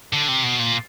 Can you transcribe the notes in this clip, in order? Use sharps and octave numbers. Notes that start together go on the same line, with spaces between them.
D3
C3
B2
A#2